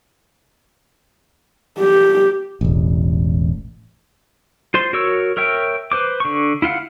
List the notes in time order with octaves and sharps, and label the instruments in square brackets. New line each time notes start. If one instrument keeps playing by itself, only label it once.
[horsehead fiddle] G4
[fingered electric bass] E1 A1
[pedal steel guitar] F4 C5 C6
F#4 A#4 C#5 C#6 E6
A#4 C#5 E5 G5
B4 C5 D6
D3 C#6
E4 F4 F5 F#5